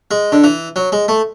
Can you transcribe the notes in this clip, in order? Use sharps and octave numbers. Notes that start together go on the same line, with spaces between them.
G#3
D3
E3
F#3
G#3
A3